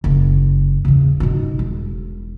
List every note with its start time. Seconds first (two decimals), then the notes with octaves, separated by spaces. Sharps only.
0.04 F#1
0.85 E2 C#3
1.20 B2 D#4
1.59 E1